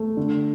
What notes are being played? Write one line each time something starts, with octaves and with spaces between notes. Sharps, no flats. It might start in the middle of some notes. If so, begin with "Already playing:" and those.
Already playing: A3
D3